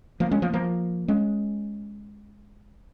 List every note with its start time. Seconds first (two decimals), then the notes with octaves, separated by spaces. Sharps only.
0.20 F3 A#3
0.31 G#3 C#4
0.42 F3 A#3
0.53 F3 A#3
1.08 G#3 C#4